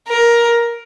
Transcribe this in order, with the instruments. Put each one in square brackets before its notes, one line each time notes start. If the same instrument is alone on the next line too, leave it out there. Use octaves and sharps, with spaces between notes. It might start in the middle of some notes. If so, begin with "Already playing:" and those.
[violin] A#4